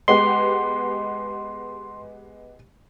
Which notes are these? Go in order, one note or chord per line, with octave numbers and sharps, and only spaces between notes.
G#3 B3 G4 C6